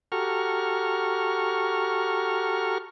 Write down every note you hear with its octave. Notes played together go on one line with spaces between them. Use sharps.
F#4 G4 A4 A#5 C#6 F6